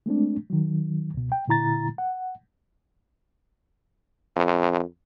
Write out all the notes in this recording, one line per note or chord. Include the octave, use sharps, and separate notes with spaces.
G#3 A3 C4 D4
D#3 F#3
C#2 B2
G5
A#2 D3 E4 A#5 A6
F#5
F2